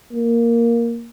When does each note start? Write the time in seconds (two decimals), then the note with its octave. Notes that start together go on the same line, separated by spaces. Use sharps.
0.13 A#3